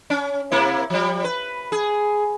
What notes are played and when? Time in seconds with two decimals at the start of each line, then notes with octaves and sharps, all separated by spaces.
0.10 C#4
0.52 C3 A#3 E4
0.90 F3 G3
1.24 B4
1.72 G#4